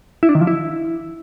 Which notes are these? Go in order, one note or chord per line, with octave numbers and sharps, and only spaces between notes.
E4
D4
D#3
F3
E4